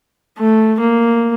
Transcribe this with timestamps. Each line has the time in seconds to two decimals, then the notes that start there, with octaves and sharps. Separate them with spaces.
0.38 A3
0.80 A#3